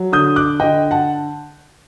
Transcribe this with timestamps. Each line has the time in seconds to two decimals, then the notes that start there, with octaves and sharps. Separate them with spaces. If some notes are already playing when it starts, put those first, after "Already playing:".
Already playing: F#3
0.12 D3 D#6 G6
0.36 D6 F#6
0.60 D3 D#5 G5
0.91 F#5 A5